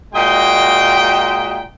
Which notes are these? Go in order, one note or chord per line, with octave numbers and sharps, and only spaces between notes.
A#2 G#3 F#4 D#5 G5